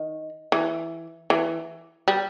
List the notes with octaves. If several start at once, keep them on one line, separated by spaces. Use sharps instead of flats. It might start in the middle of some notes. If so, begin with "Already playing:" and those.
Already playing: D#3
E3
E3
G3